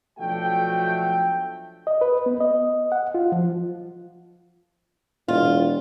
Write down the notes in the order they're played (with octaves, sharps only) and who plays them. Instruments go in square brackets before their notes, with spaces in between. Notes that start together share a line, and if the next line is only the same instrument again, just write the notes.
[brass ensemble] B1 F3 A3 D4 F#4 G5
[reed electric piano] D#5
B4
B3
D#5
F#5
F4
F3
[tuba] E1 [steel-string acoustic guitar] F4